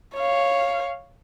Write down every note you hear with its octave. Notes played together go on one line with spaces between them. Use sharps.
C#5 F5